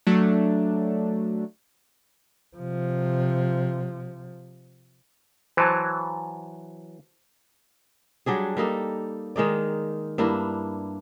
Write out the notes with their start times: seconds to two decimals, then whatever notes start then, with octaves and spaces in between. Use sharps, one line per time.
0.07 F#3 A3 D4
2.57 C3 F3
5.57 E3 F#3 C5 A5
8.26 F#3 G3 D4 G#4
8.57 G3 A#3 D#4 A4
9.36 D#3 G#3 D#4 D5
10.18 G2 A#3 D4 E4